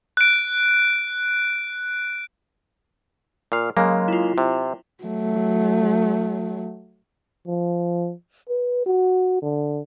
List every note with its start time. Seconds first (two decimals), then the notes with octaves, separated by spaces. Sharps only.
0.17 F#6 D7
3.52 A#2 F5
3.77 C#3 F#3 G#3 A#3 C6
4.08 E4 F4
4.38 C3
5.04 F#3 A3
7.47 F3
8.49 B4
8.86 F#4
9.42 D3